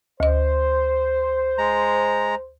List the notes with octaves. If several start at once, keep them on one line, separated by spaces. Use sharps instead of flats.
D2 C5 D#5
G#3 A#5